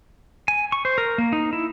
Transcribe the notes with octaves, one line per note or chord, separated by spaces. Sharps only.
G#5
C#6
C5
A#4
A#3
D#4
E4